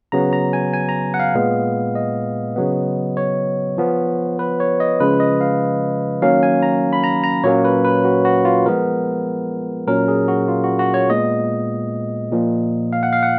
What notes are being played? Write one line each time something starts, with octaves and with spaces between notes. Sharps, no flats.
C#3 F#3 B3 A#5
A#5
G#5
G#5
A#5
F#5
F5
A#2 G#3 B3
D#5
C#3 F#3 B3
C#5
F3 B3
B4
C#5
D#5
C#3 F3 G#3 C#4 B4
D#5
F5
D#3 F#3 A#3 C#4 F5
G#5
A#5
B5
A#5
A#5
A#2 F#3 A#3 C#4 C#5
B4
B4
F#4
F#4
F4
F3 G#3 B3 A#4
A#2 F#3 C#4 A#4
G#4
F#4
F4
F#4
F#4
C#5
A#2 G#3 B3 D#5
A#2 F3 A#3
F5
F#5
F5
F#5